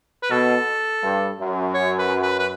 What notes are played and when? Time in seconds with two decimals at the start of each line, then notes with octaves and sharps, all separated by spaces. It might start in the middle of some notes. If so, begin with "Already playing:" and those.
0.23 B4
0.31 B2 A4
1.03 G2
1.39 F#2
1.74 C#5
1.99 B4
2.23 B4
2.39 B4